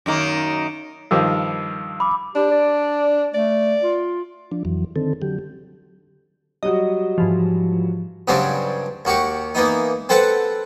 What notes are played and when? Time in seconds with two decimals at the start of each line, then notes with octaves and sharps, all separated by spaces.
0.06 F#2 D#3 A#3
1.11 G2 D#3 F3 E6
2.00 B5 D6
2.35 D4 G4
2.51 D5
3.34 A3 D5
3.82 F4
4.52 F3 D4
4.65 F2 E3 F#3
4.96 D3 D#3 C4 A4
5.22 D3 F#3 G4
6.63 F#3 G3 F#4 D#5
7.18 G#2 E3 F3
8.28 G2 C#3 F#3 C4 D4
9.05 D#2 F#4 G4 C#6
9.55 E3 A#3 B3 D#4
10.09 C4 A4 B4 F#5 A5